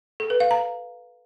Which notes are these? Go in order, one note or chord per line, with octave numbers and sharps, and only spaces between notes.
A4
B4
F5
A#5